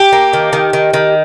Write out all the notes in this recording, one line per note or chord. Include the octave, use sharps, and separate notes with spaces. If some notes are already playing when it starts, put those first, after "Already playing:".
Already playing: G4
A#3
D#3
D#3
D#3
D#3